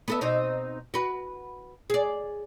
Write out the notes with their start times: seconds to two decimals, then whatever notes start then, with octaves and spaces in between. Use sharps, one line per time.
0.08 B3 A4 E5
0.21 B2 C4 D#4
0.94 F#4 B4
1.90 G#4 D5